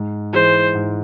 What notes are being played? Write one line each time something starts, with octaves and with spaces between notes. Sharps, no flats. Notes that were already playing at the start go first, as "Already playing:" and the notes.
Already playing: G#2
E3 G#3 C5
G#2